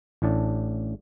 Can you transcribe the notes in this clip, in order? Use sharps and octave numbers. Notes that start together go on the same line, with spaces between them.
A1 A2 D4 A5